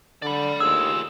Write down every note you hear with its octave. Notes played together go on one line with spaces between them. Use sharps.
D3 D5 B5
D#2 F4 G#4 E6